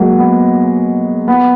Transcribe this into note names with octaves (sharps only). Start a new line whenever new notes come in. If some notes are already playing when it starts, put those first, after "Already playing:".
Already playing: F#3 G#3 A#3
B3
B3